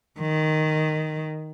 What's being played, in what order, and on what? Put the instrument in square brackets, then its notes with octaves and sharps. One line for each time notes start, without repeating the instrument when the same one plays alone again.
[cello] D#3